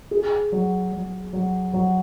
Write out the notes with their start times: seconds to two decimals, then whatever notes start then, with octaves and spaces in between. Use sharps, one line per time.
0.11 G#4
0.52 F#3
0.92 F#3
1.33 F#3
1.73 F#3